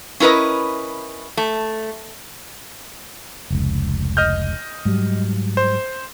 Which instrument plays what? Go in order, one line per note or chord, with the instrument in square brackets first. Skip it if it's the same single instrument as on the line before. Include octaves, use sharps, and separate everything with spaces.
[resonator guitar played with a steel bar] C#4 E4 A#4 B4 D#5
A3
[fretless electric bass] F1 C#2
[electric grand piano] D#5 F6 G6
[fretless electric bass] G#2 F#3 G3
[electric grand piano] C5